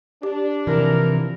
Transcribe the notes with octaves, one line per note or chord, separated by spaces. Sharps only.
D4 G4
C3 E3 F3 A#4